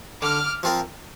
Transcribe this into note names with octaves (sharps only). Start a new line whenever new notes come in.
D3 D6 F6
F3 C4 F4 A#4